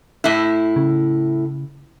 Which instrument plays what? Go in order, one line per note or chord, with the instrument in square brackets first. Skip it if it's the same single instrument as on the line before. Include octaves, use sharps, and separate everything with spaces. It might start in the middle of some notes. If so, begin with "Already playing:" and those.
[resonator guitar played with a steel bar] A2 E4
[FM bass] C#3